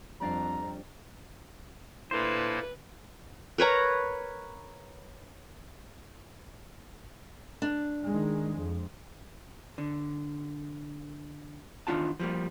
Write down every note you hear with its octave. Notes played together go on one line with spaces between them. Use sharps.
F2 G3 D4 F5 A#5
A#2 A3 A#3 D4 E4 B4 C5
A#4 B4 C#5 A#5
D4
D#3 G#3
F2
D3
E2 D#3 D4 F4 F#5 A5
F3 G3 A#3